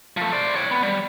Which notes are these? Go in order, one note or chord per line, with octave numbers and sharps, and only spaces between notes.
F3 A3
C5 D5
C#5 G5
B3
G3